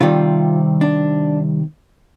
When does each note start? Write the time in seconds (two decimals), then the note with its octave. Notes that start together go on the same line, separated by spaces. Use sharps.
0.01 C3 D#3 G3 C4 F4
0.81 D4